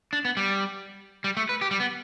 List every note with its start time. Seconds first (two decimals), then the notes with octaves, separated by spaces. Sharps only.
0.13 D4
0.25 B3
0.37 G3
1.24 G3
1.37 A3
1.49 B4
1.61 G4
1.71 G3
1.80 B3